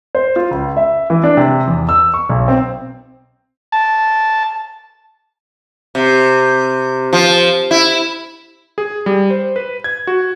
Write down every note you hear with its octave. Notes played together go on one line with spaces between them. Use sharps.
C5
F4
C#2
E5
E3
D4
C3
E2
E6
C#6
B1
C4
A5
C3
F3
E4
G#4
G3
C5
B4
G#6
F#4